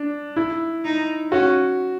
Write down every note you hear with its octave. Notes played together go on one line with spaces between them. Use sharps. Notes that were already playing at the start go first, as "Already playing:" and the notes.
Already playing: D4
E4
D#4
C#4 F#4